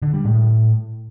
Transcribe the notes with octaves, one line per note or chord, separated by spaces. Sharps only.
D3
G3
A2